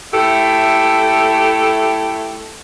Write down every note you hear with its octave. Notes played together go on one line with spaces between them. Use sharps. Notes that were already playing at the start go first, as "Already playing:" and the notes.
A3 E4 G4 A4